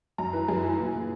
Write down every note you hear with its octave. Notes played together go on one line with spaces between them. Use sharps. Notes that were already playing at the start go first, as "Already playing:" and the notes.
F#2 A#5
E3 B4
F#2 G#4
E3
A#2
A#2